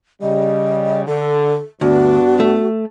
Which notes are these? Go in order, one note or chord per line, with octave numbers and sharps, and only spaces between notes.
C#3 G3 D#5
D3 A4
D2 G2 B3 D4 F#4
A3